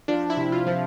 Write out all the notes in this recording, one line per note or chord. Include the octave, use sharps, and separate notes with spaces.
F3 D4
E4
C3
F4
F3